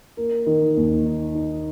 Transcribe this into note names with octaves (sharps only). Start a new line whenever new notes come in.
A#3
D#3
D#2
D#4
D#4